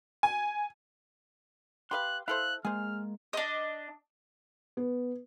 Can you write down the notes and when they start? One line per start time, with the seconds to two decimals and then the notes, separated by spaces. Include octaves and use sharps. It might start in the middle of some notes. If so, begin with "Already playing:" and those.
0.23 G#5
1.91 G4 B4 F5 C6 F#6
2.28 E4 A4 C5 F5 F#6
2.65 G#3 A#3 G#4 C5 F6
3.33 D4 D#5
4.77 B3